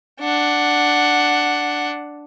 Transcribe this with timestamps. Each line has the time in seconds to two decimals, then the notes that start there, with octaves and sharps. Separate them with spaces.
0.20 D4 F#5